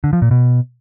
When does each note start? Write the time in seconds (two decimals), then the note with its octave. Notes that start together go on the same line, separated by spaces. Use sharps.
0.04 D3
0.13 F3
0.22 A#2
0.31 B2